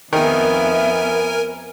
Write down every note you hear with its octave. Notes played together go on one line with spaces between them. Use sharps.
F2 D#3 B3 A#4 E5 G#5